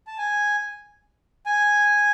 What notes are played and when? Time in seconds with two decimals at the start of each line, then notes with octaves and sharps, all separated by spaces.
0.07 A5
0.18 G#5
1.46 G#5